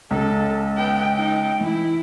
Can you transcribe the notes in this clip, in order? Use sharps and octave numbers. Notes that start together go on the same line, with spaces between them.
C#2 A4
B3 G5
D#4 G5
E3 E4